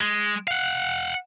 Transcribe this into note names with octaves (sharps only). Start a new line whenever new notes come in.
G#3
F5 F#5